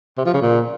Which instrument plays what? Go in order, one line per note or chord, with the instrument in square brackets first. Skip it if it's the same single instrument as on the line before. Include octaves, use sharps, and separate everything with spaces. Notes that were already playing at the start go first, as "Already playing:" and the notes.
[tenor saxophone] C3
F3
C#3
A#2